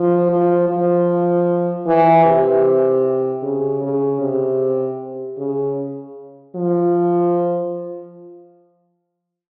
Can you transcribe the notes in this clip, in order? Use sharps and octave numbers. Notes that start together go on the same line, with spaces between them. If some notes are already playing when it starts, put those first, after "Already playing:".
Already playing: F3
F3
F3
E3
C3
C#3
C#3
C3
C#3
F3